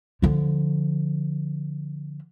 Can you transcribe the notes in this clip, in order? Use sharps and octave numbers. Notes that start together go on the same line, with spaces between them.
D3 F3